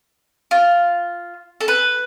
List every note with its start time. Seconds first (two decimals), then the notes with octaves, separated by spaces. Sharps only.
0.51 F4
1.61 A4
1.68 B4